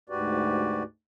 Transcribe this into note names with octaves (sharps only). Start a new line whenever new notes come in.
D2 G#2 F#4 G4 B4 D5